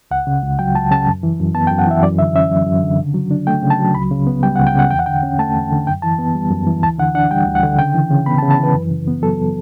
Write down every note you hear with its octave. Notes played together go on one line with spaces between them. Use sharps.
C#2 F#5
C#3
C#2
F#3 G5
C#2 A5
C#3 A5
F#2
E3
F#2
B3 A5
G5
F#2
F#5
E3 E5
F#2 D5
D3 E5
C#4 E5
F#3
F#2
D3
C#3
F#3
D4
A3 G5
C#3
A5
F#3
C#2 B5
C#3
B3
G3 G5
C#2 F#5
G5
C#3 F#5
E2 G5
F#5
D3 G5
C#4
A3 A5
E2
D3
F#2 G5
E3 A5
B3
G3
F#2
E3
D2 A5
D3 F#5
D4 F#5
G3 G5
D2
F#5
D3
C#3 G5
E3
C#3
B3 B5
A5
C#3
A5
E3 B4
F#2
C#3
B3
F#3 A4